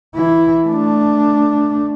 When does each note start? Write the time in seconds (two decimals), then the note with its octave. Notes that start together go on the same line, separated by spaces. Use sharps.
0.15 E3 E4
0.67 A3 D4